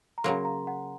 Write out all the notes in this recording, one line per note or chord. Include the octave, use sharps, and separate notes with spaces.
A#5
C#3 F#3 A#3 C6
A#5
F#5